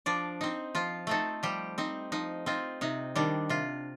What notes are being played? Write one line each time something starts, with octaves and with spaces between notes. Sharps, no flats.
F3 D4 D5
C4 D#4
F3 F4
A3 C4 D#4 A4
F3 G3 G4
C4 D#4
F3 D#4
C4 D#4 F4
C3 D#4
D#3 G3 D4
C3 F4